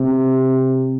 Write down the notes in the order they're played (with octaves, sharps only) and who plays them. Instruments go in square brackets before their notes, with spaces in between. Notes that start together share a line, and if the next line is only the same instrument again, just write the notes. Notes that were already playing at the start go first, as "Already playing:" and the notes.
Already playing: [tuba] C3